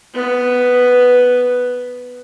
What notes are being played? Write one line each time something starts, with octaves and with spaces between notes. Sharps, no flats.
B3 B4